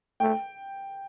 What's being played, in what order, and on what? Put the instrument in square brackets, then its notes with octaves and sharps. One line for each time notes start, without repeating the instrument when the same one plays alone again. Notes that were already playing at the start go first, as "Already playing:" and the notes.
[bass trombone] A3 [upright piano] G5